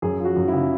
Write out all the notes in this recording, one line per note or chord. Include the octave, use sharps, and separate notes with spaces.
F#2 G#4
F3
F#4
F#2
E4
C#3